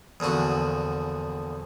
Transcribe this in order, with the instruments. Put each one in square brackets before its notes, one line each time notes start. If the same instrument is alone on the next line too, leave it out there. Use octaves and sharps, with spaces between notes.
[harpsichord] A#1 E2 D3 F#4